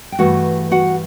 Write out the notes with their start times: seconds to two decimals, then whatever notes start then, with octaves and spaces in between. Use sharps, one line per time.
0.12 G5
0.19 G2 E3 A3 F#4 F#5
0.71 F#4 F#5